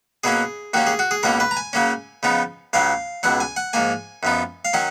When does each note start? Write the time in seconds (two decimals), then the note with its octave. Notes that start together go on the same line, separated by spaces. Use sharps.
0.24 B2 F#3 A#3 C#4 G#4
0.74 D#2 D#3 A#3 C#4 F#4
0.87 G#4
0.99 F#4
1.11 G#4
1.23 C#2 B2 A#3 C#4 A#4
1.40 B4
1.51 A#5
1.57 G#5
1.73 C#3 F#3 A#3 C#4
2.23 C#3 F3 B3 D#4
2.73 C#2 C#3 F#3 F5
3.23 C#2 B2 F#3 F#5
3.40 G#5
3.56 F#5
3.73 G#2 F3 A#3 G#5
4.23 F#2 F3 B3 D#4
4.65 F5
4.73 D#3 F#3 C#4 F#5